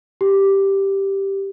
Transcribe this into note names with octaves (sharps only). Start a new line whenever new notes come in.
G4